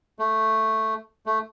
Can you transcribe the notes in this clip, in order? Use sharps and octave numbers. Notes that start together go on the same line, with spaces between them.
A3
A3